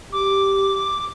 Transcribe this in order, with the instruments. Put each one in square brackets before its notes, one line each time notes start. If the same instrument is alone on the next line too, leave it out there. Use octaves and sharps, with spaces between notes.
[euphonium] G4 [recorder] D6